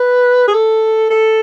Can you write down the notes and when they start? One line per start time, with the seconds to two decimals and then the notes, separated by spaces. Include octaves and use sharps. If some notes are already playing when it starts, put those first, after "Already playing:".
Already playing: B4
0.48 G#4
0.54 A4
1.10 A4